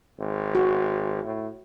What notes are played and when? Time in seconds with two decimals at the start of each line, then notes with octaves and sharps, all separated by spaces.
0.20 G#1
0.55 F#4
1.25 A2